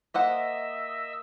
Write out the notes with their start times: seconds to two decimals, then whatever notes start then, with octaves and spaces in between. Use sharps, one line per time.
0.14 A#3 C5 D#5 E5 F#5 E6